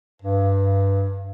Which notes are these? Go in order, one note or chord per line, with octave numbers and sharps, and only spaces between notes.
G2